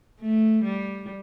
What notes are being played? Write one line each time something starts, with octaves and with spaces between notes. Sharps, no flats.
A3
G3